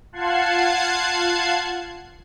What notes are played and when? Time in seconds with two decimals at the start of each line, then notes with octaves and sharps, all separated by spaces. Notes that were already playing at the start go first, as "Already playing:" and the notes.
0.12 F4 F#5 A5 F#6 G#6 C7